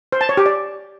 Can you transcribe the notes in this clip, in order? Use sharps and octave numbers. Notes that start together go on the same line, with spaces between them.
C5
A5
C#5
G4
D5